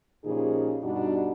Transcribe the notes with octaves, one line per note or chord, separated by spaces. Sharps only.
A#2 C#3 F3 D#4 G4 G#4
G2 B2 G3 D4 D#4 F#4